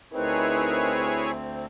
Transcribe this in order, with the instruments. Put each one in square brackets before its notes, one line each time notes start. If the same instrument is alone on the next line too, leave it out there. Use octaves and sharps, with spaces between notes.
[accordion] D2 C4 [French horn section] D#4 A#4 [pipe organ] E4 G#4 C#5 [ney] B4